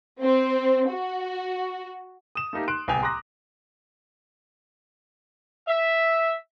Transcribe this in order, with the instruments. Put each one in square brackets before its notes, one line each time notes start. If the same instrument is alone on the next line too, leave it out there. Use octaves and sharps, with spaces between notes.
[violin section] C4
F#4
[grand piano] D#6 E7
A3 A#3 D#4 G4
C6 F#6 D7
D1 C2 B3 G5 G#5 F7
A#5 C6 D6 D#6 F#6 A#6
[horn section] E5